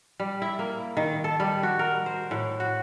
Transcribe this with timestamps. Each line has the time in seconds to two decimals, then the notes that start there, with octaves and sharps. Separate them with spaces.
0.20 G3
0.42 E4
0.59 A#3
0.97 D#3
1.24 A4
1.40 G3
1.63 F#4
1.79 A#4
2.06 C5
2.31 A2
2.60 F#4